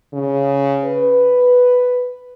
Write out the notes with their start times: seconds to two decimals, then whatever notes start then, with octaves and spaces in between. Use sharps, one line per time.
0.13 C#3
0.85 B4